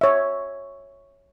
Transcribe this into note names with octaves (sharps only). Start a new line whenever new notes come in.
C#5 E5